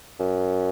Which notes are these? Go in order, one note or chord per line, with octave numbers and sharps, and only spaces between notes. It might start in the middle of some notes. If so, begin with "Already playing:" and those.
F#2